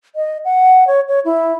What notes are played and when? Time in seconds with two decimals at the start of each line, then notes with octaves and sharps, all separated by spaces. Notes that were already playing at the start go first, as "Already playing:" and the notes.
0.16 D#5
0.45 F#5
0.87 C#5
1.09 C#5
1.25 E4